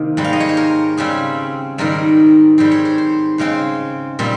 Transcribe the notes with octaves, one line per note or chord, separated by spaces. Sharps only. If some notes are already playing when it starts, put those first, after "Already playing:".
Already playing: C3 D#3 A#3
G#2 G3 C4
F5
D#5
C#5
C5
A#4
C#3 G3 C4 G#4
G#2 D#3 G3 C4 A#4
G#2 G3 C4 C5
C#5
C5
C5
C#3 G#3 C4 C5
A#2 G3 C4